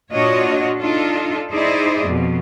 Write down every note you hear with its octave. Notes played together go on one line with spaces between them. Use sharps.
A#2 D4 F4 F#4 C#5 D#5
D4 D#4 F4 A4
D#4 E4 G#4 C5 D5 D#5
F2 B2